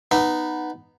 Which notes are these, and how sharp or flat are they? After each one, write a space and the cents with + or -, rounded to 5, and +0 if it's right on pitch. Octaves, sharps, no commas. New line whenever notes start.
B3 +0 D#4 -10